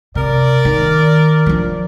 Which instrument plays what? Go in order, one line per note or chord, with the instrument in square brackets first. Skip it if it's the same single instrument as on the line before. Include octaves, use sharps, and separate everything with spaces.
[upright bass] C3 [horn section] A#4 D5
[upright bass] D#3
F3 D4